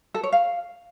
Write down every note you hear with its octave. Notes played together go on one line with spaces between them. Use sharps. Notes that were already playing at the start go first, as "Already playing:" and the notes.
A4
C#5
F5